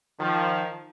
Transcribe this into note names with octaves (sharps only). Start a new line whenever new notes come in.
D#3 F3